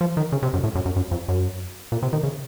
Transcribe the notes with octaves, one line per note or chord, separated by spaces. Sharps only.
F3
D#3
C#3
C3
F#2
A2
F#2
F#2
F#2
F2
F#2
A#2
C3
D#3
C#3